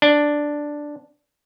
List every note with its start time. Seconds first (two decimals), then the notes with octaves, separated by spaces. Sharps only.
0.02 D4